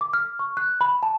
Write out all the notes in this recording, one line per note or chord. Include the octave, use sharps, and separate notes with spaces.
D6
F6
C#6
F#6
B5
A5